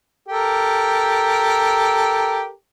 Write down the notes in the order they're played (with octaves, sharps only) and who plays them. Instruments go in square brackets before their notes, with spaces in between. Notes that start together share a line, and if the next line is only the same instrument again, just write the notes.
[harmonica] G4 A4 A#4